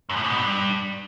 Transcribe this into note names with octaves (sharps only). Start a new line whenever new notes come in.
F#2
A2
G#2
B2
G2